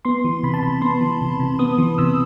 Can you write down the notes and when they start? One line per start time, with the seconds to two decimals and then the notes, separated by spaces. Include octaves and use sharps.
0.05 B3 C6
0.24 E3
0.43 C3 B5
0.54 A5
0.63 C3 B5
0.82 B3 C6
1.01 E3
1.21 C3
1.40 C3
1.59 B3 D#6
1.78 E3
1.98 C3 E6